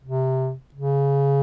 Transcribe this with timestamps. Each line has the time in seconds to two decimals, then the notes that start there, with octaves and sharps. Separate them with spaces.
0.04 C3
0.75 C#3